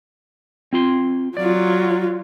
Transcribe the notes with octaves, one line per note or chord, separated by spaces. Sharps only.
C4 F4 C6
F#3 F4 D5